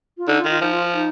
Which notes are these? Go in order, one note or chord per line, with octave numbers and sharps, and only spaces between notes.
F4
D3 D#4
F4
D#3
F4
F3 D#4
F4
D#4